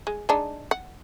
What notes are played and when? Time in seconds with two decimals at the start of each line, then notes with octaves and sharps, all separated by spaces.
0.07 G#3
0.29 G#3 D4 D#4
0.71 F#5